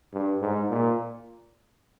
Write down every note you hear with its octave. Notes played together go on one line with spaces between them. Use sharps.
G2
G#2
A#2